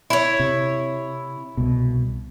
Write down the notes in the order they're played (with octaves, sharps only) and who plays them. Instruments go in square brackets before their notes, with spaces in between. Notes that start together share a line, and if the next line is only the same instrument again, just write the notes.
[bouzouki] E4 C#5
[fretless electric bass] C3
C2 B2